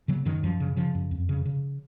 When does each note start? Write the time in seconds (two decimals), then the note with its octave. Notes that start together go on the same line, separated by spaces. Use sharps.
0.08 C#3 F#3 A#3
0.25 F#2 D#3 F#3
0.43 F#2 F3
0.60 C#3
0.77 C#3 F3
0.95 F#2
1.11 F2
1.29 C#3
1.46 C#3